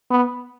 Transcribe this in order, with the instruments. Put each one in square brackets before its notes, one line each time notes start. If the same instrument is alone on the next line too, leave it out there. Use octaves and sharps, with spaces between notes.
[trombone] B3